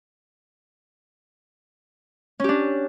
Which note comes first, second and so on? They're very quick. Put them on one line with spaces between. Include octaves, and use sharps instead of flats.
C#4 G4 D4